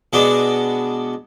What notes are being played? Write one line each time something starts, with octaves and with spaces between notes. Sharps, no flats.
B2 G#3 B3 D4